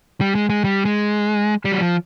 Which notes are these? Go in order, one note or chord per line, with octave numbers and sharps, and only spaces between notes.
G3
G#3
G#3
G3
G#3
G3
F#3
F3